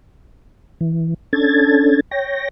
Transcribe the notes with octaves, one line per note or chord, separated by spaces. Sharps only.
E3
C#4 D4 A4 G#6 A6
C#5 G5 A#6